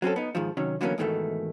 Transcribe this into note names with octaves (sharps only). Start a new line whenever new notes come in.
F#3 C4 C#4 A4
B3 D#4
G#2 D#3 F3
C3 D#3 F#3 C#4
D3 E3 F#3 A#3 B3 C#4
G#2 B2 D#3 E3 G#3 A3